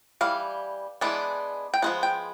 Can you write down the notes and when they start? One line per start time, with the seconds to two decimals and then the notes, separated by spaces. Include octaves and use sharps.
0.21 E3 G3 F5
1.01 E3 G#3 B3 D4
1.74 G5
1.82 F3 G#3 B3 F#5
2.03 G5